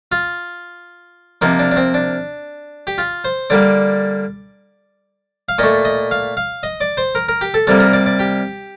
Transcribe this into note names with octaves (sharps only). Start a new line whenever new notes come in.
F4
C3 F3 A#3 D#4
D4
D4
C4
D4
G4
F4
C5
D3 G3 A#3 D5
F5
A#2 A3 D#5
D#5
F5
F5
D#5
D5
C5
A#4
A#4
G4
A4
C3 G3 A#3 A4
A#4
D5
D5
G4